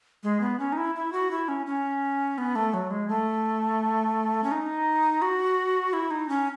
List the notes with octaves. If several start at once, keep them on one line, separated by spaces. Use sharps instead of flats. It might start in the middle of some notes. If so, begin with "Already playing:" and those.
G#3
B3
C#4
D#4
E4
E4
F#4
E4
C#4
C#4
B3
A3
F#3
G#3
A3
C#4
D#4
F#4
E4
D#4
C#4